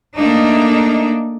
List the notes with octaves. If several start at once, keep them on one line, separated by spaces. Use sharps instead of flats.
A3 A#3 D4 D#4